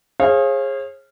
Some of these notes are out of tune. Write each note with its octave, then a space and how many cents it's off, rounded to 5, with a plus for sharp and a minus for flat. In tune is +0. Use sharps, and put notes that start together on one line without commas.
G#4 +0 C#5 -45 F5 -15